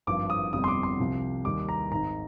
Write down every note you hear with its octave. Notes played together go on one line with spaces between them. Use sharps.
G#1 G2 F3 D6
D#6
G1 F2 C3 G3 D#6
C6
D6
C6
C2 C3 F3
D#2 D#3 G3 D6
A#5
G#1 G#2 D#3 A#5